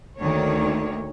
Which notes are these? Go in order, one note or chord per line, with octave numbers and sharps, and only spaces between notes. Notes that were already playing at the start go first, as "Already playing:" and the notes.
D2 D#3 A#3 C#5